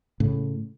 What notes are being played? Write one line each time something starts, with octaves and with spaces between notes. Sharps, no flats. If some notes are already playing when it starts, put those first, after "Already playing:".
A2 C#3